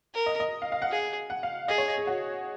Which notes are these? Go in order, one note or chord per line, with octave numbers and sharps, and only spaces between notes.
A#4
D#5
D#5
F5
F5
F#5
G#4
F#5
F5
G#4 D#5
C#5
D#5
G#4
F#4